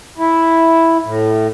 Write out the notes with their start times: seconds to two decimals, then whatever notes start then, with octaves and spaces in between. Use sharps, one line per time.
0.18 E4
1.04 A2